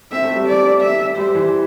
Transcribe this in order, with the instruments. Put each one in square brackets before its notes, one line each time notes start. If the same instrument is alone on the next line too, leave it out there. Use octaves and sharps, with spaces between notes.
[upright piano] C4 [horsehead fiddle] E5
[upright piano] A3
G3
[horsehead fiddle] D5
E5
[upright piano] G3 [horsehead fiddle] C5
[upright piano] E3